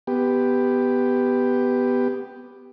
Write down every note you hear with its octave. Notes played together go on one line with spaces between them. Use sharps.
B3 G4